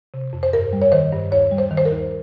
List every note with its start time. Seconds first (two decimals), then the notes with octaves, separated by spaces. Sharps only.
0.14 C3
0.33 F2
0.43 C5
0.53 G2 A#4
0.73 G3
0.82 C#5
0.92 D#3 C5
1.13 G2
1.32 D#2 C#5
1.52 G3
1.58 C5
1.71 D#3
1.78 C5
1.85 A#4
1.91 D#2